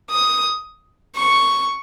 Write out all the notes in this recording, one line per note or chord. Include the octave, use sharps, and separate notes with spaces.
D#6
C#6